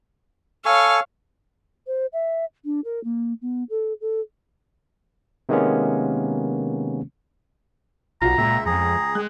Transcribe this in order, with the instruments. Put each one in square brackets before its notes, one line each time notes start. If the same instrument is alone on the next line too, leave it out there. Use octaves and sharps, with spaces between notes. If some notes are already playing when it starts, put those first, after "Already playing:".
[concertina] A4 G#5 C#6 [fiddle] C#5 F5
[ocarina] C5
E5
D4
A#4
A#3
B3
A4
A4
[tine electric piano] C3 D#3 G#3 A#3 B3 C#4
[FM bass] B1 [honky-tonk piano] F4 F#4 [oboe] A#5
[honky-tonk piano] C#2 [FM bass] A#2 [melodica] E5
[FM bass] F2 [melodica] G#4 [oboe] A#5
[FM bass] G#3 [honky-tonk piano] F#6